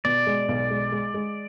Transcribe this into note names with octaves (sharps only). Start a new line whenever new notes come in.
B2 D5
G#3
B1
G#3
G#3
G#3